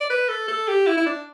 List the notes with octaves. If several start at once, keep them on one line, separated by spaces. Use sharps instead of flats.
D5
B4
A4
A4
G4
E4
E4
D4